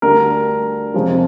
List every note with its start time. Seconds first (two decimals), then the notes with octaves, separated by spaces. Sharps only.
0.02 D2 D3 G3 A#4
0.94 F2 C3 F3 G#3